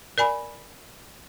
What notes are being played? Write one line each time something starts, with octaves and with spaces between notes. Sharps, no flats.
A#4 D5 G#5 B5